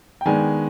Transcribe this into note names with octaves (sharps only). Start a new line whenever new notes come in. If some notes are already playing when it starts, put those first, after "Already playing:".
G5
D#3 G#3 B3 D4 G#5